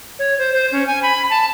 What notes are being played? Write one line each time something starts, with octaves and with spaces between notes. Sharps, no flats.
C#5
C5
C5
C#4
G#5
B5
A5